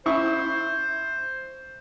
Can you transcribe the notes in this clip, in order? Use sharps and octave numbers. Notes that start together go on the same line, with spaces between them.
E4 C5 C#6